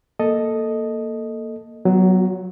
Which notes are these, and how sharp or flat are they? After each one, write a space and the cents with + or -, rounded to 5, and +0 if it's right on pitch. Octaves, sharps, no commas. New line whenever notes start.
A#3 +0 A4 +0 D#5 +0
F#3 +15 B3 +0 F#4 -40